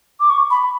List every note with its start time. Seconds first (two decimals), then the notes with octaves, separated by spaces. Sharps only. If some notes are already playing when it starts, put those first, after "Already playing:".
0.20 D6
0.30 C#6
0.50 B5